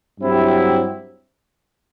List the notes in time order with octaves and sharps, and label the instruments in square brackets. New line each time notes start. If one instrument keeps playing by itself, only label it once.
[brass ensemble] G2 F#3 C4 E4 G4